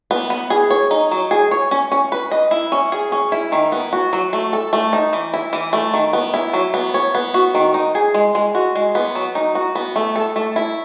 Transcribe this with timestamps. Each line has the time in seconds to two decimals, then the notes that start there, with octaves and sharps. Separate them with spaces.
0.11 B3
0.30 B3
0.50 G#4
0.71 C#5
0.91 D#4
1.11 F#3
1.31 G#4
1.51 C#5
1.71 C#4
1.92 C#4
2.12 B4
2.31 D#5
2.51 E4
2.72 C#4
2.92 G#4
3.12 C#4
3.32 E4
3.52 D#3
3.72 B3
3.93 F#4
4.13 F#3
4.33 A3
4.53 A4
4.73 A3
4.93 D#4
5.13 E3
5.34 E4
5.53 E3
5.73 A3
5.94 D#3
6.13 B3
6.34 E4
6.53 F#3
6.74 B3
6.94 C#5
7.15 B3
7.34 F#4
7.55 D#3
7.74 D#4
7.95 G#4
8.14 G#3
8.35 G#3
8.55 F#4
8.76 G#3
8.95 B3
9.15 F#3
9.35 D#4
9.55 F#4
9.75 B3
9.96 A3
10.16 A4
10.36 A3
10.56 E4